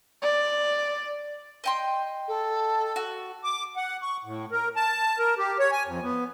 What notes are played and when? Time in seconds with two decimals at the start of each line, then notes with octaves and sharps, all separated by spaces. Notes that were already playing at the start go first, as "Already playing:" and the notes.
0.22 D5
1.64 D#5 G5 C6
2.28 A4
2.96 F#4
3.44 D6
3.76 F#5
4.02 C#6
4.25 A2
4.52 A#4
4.76 A5
5.18 A#4
5.38 G4
5.59 C#5
5.72 G#5
5.87 F2
6.02 B3